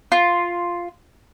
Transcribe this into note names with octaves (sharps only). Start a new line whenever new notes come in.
F4